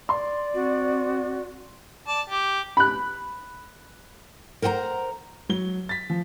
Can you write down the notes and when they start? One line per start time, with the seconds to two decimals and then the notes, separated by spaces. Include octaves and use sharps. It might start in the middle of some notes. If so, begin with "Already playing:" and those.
0.09 D5 C6
0.54 C4 F#4
2.08 D5 A5
2.29 G4
2.77 B5 F#6
4.62 A#4 C5 F#5 G5 A#5
5.49 F#3 G7
5.89 A6 B6
6.10 F3